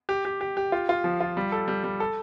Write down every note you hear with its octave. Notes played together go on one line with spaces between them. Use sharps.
G4
G4
G4
G4
F4
F4
F3
F4
G3
A4
G3
G3
A4